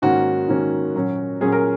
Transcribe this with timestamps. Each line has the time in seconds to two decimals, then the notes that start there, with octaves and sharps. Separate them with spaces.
0.02 G#2 D#3 A#3 C#4 F#4
0.48 G#2 D#3 A#3 C#4
0.95 A#2 F#3 C#4
1.41 A#2 F#3 C#4 G#4
1.52 A#4